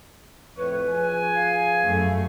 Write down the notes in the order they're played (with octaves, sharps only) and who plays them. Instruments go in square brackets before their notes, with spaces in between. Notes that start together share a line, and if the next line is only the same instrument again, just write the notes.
[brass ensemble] F2 A2 C#5 [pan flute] B4
[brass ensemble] F3 G#4 G#5
[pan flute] F5
[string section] F#2 A3